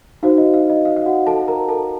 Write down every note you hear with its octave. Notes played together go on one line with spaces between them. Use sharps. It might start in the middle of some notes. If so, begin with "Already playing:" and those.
D#4 F#4 C5 F5
D#5
F5
D#5
F5
F5
F#4 F#5
A4 A5
A#4 A#5
A4 A5